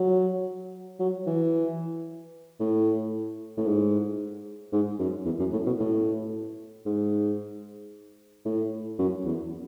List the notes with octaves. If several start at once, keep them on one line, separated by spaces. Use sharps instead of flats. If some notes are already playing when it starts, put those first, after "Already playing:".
Already playing: F#3
F#3
E3
A2
A2
G#2
G#2
F#2
E2
F#2
A2
B2
A2
G#2
A2
F#2
E2